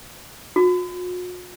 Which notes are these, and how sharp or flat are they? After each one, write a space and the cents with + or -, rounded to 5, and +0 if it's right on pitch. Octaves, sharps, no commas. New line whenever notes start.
F#4 -45